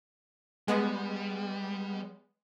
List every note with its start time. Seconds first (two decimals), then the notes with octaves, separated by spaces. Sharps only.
0.68 G3 G#3 B3